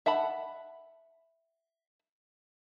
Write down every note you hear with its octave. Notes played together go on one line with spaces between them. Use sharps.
E5 F#5 A5 B5